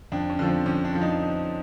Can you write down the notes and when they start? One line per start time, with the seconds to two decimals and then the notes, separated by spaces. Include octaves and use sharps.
0.12 F2 D4
0.30 C#4
0.39 D3 F3
0.48 C4
0.66 F2 C#4
0.85 D4
0.92 D3 F3
1.02 D#4